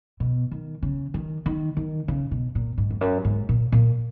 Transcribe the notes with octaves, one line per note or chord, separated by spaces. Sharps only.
B2
D#3
C#3
D#3
D#3
D#3
C#3
B2
A#2
G#2
F2
F#2
G#2
A#2
A#2